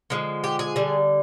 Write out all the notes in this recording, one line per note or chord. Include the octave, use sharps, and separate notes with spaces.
D3 F3 G#3
G4
G#4
D3 G3